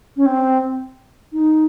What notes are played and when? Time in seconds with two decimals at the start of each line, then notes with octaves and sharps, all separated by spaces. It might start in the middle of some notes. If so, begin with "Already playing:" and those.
0.17 C#4
0.26 C4
1.33 D#4